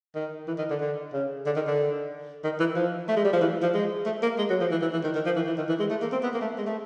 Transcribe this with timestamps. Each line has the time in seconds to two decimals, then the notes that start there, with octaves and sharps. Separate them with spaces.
0.15 D#3
0.48 E3
0.58 D#3
0.70 D3
0.81 D3
1.13 C#3
1.46 D3
1.56 D#3
1.67 D3
2.44 D#3
2.60 E3
2.76 F3
3.08 A3
3.16 G#3
3.25 G3
3.33 F3
3.41 E3
3.62 F3
3.74 G#3
4.05 A3
4.22 A#3
4.38 G#3
4.50 F#3
4.60 F3
4.71 E3
4.81 E3
4.93 E3
5.04 D#3
5.15 D#3
5.25 F3
5.36 E3
5.47 E3
5.58 D#3
5.69 E3
5.79 G#3
5.90 A3
6.02 A#3
6.12 C4
6.23 B3
6.34 A#3
6.41 A3
6.58 G#3
6.66 A3